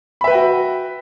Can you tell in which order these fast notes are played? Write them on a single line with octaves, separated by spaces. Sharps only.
B5 E5 B4 G5 F#4